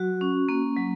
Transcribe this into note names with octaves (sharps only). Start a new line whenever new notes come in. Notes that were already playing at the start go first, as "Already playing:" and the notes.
Already playing: F#3 F#4
C#4
A#3
F#3